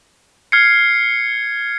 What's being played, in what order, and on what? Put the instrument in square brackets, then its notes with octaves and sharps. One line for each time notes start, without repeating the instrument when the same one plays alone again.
[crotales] F6 G#6 C7 C#7